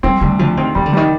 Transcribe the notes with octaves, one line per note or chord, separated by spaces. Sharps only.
G3 C4
D2 G3
D2 F3
D#3 C4
D#3 G3
D3
D#3 G3